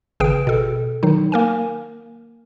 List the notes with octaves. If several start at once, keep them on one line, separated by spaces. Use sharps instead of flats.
G#1 C#3 G#4 B4 G5 D7
B2 A4
D#3 F#3 D#4
A#3 A#4 G#5